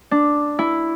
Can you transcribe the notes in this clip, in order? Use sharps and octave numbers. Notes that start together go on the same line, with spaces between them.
D4
E4